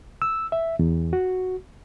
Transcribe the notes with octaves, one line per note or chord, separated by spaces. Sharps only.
E6
E5
E2
F#4